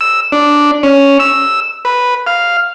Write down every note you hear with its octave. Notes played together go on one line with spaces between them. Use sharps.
E6
D4
C#4
E6
B4
F5